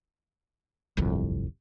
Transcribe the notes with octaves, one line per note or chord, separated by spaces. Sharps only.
D1 G1 C2 F2